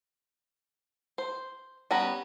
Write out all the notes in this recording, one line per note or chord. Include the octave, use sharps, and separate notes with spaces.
C5
G3 B3 C#4 A#5